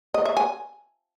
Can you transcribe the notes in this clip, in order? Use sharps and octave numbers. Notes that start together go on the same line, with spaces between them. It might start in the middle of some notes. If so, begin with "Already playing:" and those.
D#5
E5
G#5